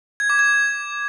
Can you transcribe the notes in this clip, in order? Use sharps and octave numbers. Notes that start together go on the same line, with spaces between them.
G#6
D6
G#6